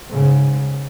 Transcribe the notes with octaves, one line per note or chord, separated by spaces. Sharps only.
G#2 C#3